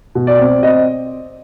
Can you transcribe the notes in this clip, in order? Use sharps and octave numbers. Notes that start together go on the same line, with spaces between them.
B2
D5
C4
C4 D#5